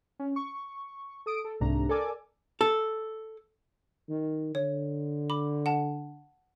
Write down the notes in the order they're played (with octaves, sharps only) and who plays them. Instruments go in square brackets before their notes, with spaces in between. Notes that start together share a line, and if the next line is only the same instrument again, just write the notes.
[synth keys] C#4
C#6
A4 D#6 D7
A4
C2 G#2 C3 A3 D4 A#5
A4 A#4 D5 G#5 D6
[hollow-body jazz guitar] A4
[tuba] D#3
[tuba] D3 [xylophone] C#5
[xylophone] B5 D6
F#5 A5